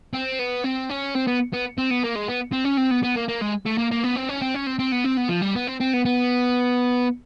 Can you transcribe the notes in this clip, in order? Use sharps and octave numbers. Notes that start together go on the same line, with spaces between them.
C4
B3
C4
C#4
C4
B3
B3
C4
B3
A#3
G#3
B3
C4
C#4
C4
B3
B3
A#3
A#3
G#3
A3
A#3
A#3
B3
C4
C#4
C4
C#4
C4
C4
B3
C4
B3
F3
G3
B3
C4
C4
B3
B3